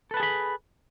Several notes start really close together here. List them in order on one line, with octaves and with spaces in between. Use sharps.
A4 B4 A5 G#4 B5